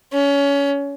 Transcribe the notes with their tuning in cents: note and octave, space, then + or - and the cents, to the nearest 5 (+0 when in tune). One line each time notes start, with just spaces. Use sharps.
C#4 +25